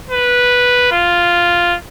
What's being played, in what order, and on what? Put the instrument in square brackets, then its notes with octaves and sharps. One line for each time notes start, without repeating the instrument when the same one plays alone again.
[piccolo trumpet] B4
F4